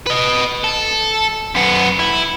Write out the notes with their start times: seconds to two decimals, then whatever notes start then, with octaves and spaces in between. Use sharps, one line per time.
0.06 B4 D#5
0.64 A4
1.55 F#2 B3
1.99 E4